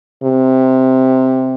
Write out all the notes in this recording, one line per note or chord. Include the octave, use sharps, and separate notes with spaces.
C3